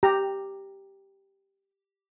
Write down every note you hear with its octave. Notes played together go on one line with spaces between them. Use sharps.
G4 A#5